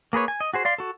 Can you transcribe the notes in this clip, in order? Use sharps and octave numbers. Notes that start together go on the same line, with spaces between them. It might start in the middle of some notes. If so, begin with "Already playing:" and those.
A#3 G#4 B4 C#5
G#5
D#5
F#4 G#4 C5
D5 F5 C6
F#4 A4